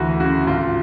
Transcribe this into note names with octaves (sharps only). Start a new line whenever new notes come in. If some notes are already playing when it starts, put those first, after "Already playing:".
Already playing: D2 E3 F#4
C#3 F#4
G#1 F4